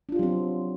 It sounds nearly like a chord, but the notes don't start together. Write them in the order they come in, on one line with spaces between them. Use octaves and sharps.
D4 F4 G4 F#3 C4